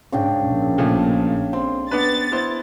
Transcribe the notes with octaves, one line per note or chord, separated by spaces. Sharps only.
G#2 C#3 D4 G5
A#1
A#2 F3 A3
C4 C6
B3 D4 B4 A6
B3 E4 C5